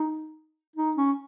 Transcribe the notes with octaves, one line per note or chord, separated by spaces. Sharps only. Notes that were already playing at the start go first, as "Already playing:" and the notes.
Already playing: D#4
D#4
C#4